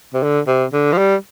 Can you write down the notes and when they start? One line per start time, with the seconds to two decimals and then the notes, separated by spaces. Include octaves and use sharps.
0.14 C3
0.23 D3
0.47 C3
0.73 D3
0.92 F3
0.98 G3